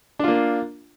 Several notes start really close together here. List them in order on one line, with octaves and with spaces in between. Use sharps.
D4 F4 A#3